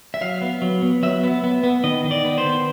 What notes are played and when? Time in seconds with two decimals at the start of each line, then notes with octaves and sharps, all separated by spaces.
0.14 E5
0.21 F#3 F5
0.41 B3
0.62 F#3
0.82 B3
1.03 F#3 E5
1.24 B3
1.44 B3
1.63 B3
1.84 D#3 D#5
2.04 D#3
2.11 D5
2.25 B3
2.38 C5
2.45 D#3